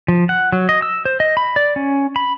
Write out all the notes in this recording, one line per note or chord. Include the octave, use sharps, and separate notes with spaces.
F3
F#5
F#3
D#5
E6
C5
D#5
B5
D5
C#4
B5